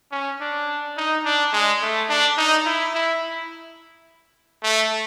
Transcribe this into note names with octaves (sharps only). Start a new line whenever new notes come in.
C#4
D4
D#4
D4
G#3
A3
D4
D#4
E4
E4
A3